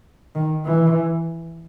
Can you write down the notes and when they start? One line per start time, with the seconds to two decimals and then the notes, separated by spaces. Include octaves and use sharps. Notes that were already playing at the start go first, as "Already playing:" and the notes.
0.35 D#3
0.65 E3